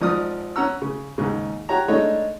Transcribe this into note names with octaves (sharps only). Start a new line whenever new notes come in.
G#1 F3 D5 D#6 F6
C#4 F#5 A#5 E6
C#3
D#2 G#2 C#3
F#4 G4 C#5 A#5
G#3 A3 D4 D#4 C#5